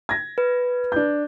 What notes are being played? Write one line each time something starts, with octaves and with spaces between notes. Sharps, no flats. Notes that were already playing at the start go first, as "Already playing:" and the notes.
G#6 A#6
B4
D4 G6